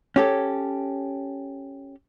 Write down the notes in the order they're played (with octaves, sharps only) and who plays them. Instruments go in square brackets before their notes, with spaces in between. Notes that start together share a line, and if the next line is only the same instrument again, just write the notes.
[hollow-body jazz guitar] C#4 G4 A4